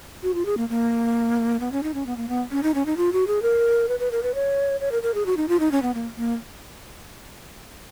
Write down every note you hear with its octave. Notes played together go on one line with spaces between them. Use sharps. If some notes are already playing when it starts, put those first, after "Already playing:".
F#4
F4
G#4
A#3
A#3
B3
C#4
D#4
C#4
B3
A#3
B3
C#4
D#4
C#4
D#4
F4
F#4
G#4
A#4
B4
B4
A#4
B4
C#5
C#5
A#4
A#4
G#4
F#4
D#4
F4
D#4
C#4
B3
A#3
A#3